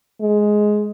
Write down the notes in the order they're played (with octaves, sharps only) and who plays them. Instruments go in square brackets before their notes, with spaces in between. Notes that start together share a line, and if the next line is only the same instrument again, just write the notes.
[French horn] G#3